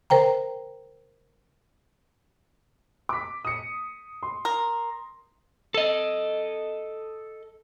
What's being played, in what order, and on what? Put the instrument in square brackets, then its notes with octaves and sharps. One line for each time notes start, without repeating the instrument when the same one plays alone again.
[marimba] A#4 C5 G5 A#5
[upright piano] D6 B6
D#6 C#7
C6
[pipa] A#4
[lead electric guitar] A4 D#5